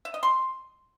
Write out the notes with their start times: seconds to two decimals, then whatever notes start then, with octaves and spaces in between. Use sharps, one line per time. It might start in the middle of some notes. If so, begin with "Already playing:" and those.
0.05 E5
0.14 D#5
0.23 C6